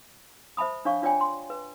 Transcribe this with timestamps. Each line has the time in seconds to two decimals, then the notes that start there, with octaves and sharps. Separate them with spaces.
0.57 C5 E5 A5 B5 D#6
0.85 D4 C#5 F5 C#6
1.02 D4 F4 C#5 D5 G5 G#5
1.21 C6
1.50 B4